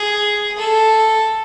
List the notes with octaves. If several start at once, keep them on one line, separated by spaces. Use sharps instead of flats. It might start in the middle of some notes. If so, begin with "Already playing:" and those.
Already playing: G#4
A4